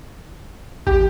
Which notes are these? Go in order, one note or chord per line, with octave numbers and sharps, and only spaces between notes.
A1 G4